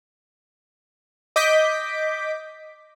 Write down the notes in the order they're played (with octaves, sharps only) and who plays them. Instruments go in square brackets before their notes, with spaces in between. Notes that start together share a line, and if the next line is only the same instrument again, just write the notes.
[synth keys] D#5 D6 G6 B6 D7